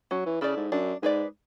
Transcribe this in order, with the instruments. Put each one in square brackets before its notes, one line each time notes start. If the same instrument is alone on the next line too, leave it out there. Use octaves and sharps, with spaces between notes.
[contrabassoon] F#3 [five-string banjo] C#4
[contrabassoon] E3
[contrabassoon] C#3 [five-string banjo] E4 A4 D5
[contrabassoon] G#2
[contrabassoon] F#2 [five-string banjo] D4
[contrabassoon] G#2 [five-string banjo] G#4 B4 D5